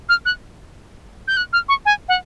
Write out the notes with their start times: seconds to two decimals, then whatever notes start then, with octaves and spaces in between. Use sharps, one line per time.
0.09 F6
0.26 F#6
1.28 G6
1.37 F#6
1.53 F6
1.69 C#6
1.85 G#5
2.09 F#5